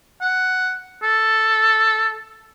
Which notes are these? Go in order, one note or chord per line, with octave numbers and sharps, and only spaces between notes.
F#5
A4